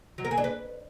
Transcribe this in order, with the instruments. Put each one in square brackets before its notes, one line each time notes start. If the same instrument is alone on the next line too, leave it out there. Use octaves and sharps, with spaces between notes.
[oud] F#3
A#4
G#4
D4
B4